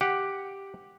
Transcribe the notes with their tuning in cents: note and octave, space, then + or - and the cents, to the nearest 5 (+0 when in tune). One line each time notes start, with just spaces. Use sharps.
G4 +0 F#5 +0